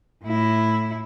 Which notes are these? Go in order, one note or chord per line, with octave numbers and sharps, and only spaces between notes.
A2 E4